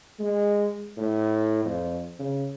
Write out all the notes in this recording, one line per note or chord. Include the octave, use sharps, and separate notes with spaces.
G#3
A2
F2
C#3